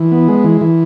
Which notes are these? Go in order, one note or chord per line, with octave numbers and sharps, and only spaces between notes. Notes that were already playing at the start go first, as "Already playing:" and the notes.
Already playing: E3
B3
G#3
E3
E3